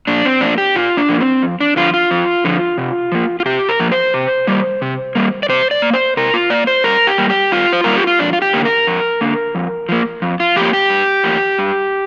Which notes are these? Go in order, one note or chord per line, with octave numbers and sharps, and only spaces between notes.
A#2 D4
C4
F3 A#3 D4
G4
A#2 F4
D4
F3 A#3
C4
F2
D4
D3 F3 F4
F4
F2
D3 F3
C3
F3 A#3
F4
C3 G4
A#4
F3 A#3
C5
C3
G3 A#3
C3
G3 A#3
D5
C3 C5
D5
A#3
C5
C3 A#4
F4
A#3 D5
C5
G2 A#4
G4
G3 A#3
G4
G2 F4
C5
G3 A#3 A#4
G4
F4
F2 D4
F4
G4
D3 A#3
A#4
F2
D3 A#3
F2
F3 A#3
F2
F4
F3 A#3 G4
G4
G2
F3 A#3
G2